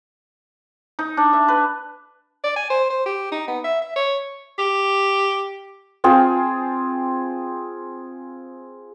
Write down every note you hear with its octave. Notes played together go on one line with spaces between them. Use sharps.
D#4
D4
E5
B4
D5
G#5
C5
C5
G4
D#4
B3
E5
E5
C#5
G4
C4 F4 G#4